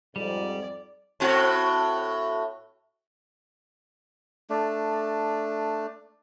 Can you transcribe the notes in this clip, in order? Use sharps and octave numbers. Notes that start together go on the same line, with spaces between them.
F2 G#2 G3 D5
A2 C4 F#4
A3 D4